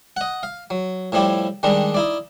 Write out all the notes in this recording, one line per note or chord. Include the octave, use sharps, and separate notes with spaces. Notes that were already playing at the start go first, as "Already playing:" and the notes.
D#5 F#5
F5
F#3
A2 F3 G3 E4 G4
D#3 G3 G#3 D4
D#4 E4 D5